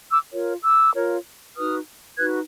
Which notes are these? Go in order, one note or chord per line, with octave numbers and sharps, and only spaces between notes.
D6 E6
F4 A#4 C#5
D6 E6
F4 A#4 C#5
D#4 F#4 B4 D#6 F6
D#4 F#4 B4 F#6 G#6